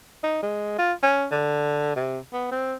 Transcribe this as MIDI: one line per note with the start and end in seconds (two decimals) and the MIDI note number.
0.23 0.42 63
0.43 0.77 56
0.78 0.93 65
1.02 1.26 61
1.31 1.93 50
1.96 2.19 48
2.33 2.51 59
2.51 2.74 60